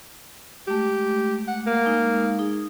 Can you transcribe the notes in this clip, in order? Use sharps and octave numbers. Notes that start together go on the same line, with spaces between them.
G#3 A3 G4
F#5
A#3
G#3 D#4
D#4 G#4